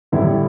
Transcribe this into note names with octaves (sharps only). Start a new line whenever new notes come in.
A1 G2 D3 E4